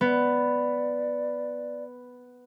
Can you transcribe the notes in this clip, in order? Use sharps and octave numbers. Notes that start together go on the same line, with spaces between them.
B3 D5